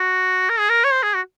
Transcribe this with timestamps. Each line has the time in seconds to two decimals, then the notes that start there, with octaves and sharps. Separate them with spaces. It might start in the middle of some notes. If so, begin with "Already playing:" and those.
Already playing: F#4
0.49 A#4
0.59 G#4
0.70 A#4
0.84 C#5
0.92 C5
1.03 G#4
1.14 F#4